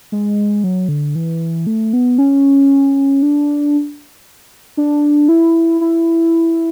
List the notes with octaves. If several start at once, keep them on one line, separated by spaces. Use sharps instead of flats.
G#3
F#3
D3
E3
A3
B3
C#4
D4
D4
E4
E4